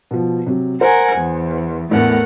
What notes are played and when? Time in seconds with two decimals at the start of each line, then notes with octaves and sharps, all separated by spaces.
0.11 B2 F3
0.47 C3 F#3
0.81 A#4 C5 F#5 G#5
1.18 E2
1.91 E2 A2 A3 A#4 F#5